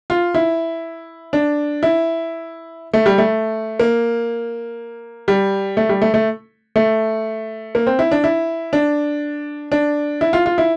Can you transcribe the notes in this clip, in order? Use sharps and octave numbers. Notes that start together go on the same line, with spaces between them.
F4
E4
D4
E4
A3
G3
A3
A#3
G3
A3
G3
A3
A3
A3
A#3
C4
E4
D4
E4
D4
D4
E4
F4
F4
E4